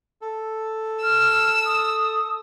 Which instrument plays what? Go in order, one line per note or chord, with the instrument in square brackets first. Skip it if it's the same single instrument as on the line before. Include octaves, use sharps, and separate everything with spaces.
[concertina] A4
[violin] E6 [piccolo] F6
[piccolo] D#6